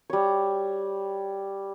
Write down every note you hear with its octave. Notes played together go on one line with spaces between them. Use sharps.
G3 C#5